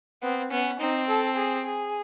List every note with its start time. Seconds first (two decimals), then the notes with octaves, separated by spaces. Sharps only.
0.22 B3 C4
0.51 B3 C#4
0.79 C4 D#4
1.08 A4
1.36 G#4
1.65 G#4